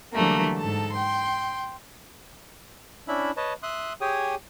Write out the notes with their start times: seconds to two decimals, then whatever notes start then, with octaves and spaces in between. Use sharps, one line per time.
0.13 D3 E3 F#3 G3 A3 A#3
0.58 G#2 A4 A5
0.92 G5 C6
3.08 C#4 D4 E4 E5 B5
3.37 B4 C#5 D#5 A5
3.63 E5 C6 D#6 F#6
4.01 G4 G#4 C#5 G5 G#5 D#6